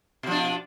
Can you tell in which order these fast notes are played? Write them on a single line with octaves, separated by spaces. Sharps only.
B2 F3 D4